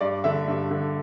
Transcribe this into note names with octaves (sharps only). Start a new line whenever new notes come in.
G2 D5
D3 E5
G2
D3